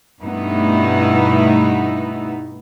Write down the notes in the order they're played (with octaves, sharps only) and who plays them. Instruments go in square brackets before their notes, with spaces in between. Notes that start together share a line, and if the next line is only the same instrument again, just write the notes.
[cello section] G2 B2 A3 B3 D#4 E4